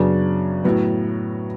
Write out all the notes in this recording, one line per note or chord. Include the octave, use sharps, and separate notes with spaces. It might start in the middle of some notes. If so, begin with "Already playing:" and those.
Already playing: F#2 C#3 F#3 B3 D4
A2 F#3 B3